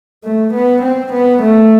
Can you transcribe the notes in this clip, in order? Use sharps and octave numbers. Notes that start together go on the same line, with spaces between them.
A3
B3
C4
B3
A3